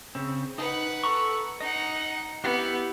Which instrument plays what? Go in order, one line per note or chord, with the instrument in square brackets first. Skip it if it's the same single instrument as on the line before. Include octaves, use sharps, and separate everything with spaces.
[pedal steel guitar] C#3 C4
[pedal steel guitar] D#4 [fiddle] B4 F#5
[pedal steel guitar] A4 A#5 C#6
[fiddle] D#4 F#5 [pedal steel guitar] D#5
[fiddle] B3 [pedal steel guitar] E4 G4 F#5